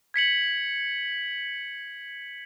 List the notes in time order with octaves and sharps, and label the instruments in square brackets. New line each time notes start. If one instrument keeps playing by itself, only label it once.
[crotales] G#6 B6 C#7 F#7